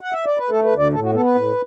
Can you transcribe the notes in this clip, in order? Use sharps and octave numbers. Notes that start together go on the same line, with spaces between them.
F#5
E5
D5
B4
A3 A4
B4
D2
D5
A2 A4
F#4
B3 A4
B4
A2